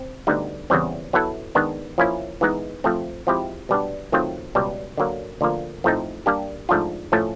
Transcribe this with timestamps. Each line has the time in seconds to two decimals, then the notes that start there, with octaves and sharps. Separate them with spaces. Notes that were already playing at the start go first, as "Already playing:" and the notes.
Already playing: C4
0.27 D2 D3 G3 B3 D#4
0.70 E2 C#3 E3 G3 C4
1.13 F#3 B3 E4 A4
1.55 D#3 G#3 B3 D4
1.98 F3 A#3 C#4 E4
2.41 E3 G#3 B3 D#4
2.84 F3 A3 C4
3.27 F3 G#3 C4 E4 G4
3.69 B2 G3 B3 D4
4.12 D#3 F#3 A3 C4 F4
4.55 C#2 B2 G3
4.97 D3 F#3 A#3
5.41 D2 D3 F3 A#3
5.84 A2 F3 A3 C4 D#4
6.26 G3 A#3 D4 G4
6.69 G#2 F3 A3 D4 F4
7.12 A2 F3 A3 C#4